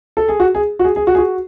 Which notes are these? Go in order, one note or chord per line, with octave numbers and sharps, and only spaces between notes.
A4
G#4
F#4
G#4
F#4
G#4
G#4
F#4
G#4
F#4